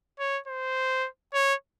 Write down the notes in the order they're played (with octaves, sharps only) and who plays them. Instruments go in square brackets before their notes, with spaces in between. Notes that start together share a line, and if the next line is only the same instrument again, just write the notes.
[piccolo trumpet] C#5
C5
C#5